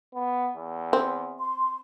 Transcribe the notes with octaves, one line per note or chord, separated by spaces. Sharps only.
B3
E2
C4
C6